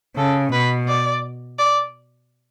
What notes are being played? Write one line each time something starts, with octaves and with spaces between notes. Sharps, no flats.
C#3 A4
B2 B4
D5
D5